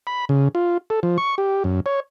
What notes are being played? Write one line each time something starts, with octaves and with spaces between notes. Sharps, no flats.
B5
C#3
F4
A4
F3
C#6
G4
F#2
C#5